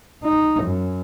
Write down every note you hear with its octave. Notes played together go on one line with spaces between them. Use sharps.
D#4
F#2